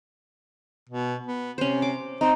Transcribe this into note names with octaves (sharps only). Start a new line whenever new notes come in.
B2
B3
C3 C#4 C5
D6
C4 D#4